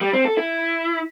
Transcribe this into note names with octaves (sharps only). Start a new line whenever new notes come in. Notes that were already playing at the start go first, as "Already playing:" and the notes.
G3
C4
A4
E4